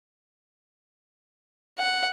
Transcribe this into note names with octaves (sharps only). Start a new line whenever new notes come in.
F#5